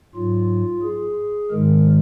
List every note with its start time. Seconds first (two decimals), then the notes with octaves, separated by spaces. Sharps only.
0.15 G#2 F#3 F4
0.83 G#4
1.51 G#2 D#3 G#3 A#4